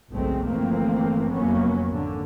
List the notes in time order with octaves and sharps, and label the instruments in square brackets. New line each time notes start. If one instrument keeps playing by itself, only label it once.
[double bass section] F#1 B1 G#3 A3 C4
G1 E3 F3 A3 A#3 C4
F1 F2 F#3 A#3 B3 C#4
G#1 D3